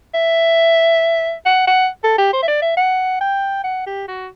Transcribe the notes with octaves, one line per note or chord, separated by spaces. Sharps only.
E5
F#5
F#5
A4
G4
C5
E5
D5
E5
F#5
G5
F#5
G4
F#4